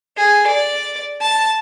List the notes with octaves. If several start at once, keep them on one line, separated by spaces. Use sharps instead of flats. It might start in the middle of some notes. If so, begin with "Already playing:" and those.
G#4
D5
A5